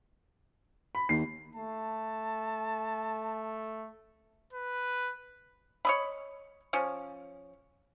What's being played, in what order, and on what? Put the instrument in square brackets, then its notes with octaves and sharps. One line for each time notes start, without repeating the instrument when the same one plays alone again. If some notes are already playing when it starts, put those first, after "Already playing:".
[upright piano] B5
[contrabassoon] D#2 [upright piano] C7
[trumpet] A3 [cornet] A5
[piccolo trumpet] B4
[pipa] C#5 D#5 B5
F3 C#4